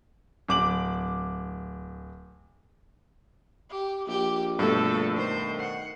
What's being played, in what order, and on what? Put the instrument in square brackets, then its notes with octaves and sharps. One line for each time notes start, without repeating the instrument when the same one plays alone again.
[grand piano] D1 D6 F#7
[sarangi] G4
[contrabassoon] A#1 [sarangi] G4
[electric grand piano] G2 B2 A3 [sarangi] A4
[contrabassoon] D#3 [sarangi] C5
[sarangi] F#5 [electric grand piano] C7